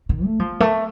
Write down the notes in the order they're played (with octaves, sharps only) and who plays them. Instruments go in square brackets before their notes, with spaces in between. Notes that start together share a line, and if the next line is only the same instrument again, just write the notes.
[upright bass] D#3
A3
F3
A3